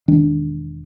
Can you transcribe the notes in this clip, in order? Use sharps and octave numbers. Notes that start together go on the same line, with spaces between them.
E1 D#3 D4